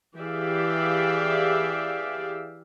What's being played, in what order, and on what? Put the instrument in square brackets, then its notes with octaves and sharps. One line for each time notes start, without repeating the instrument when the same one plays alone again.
[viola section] E3 G4 G#4 D5 E5 F5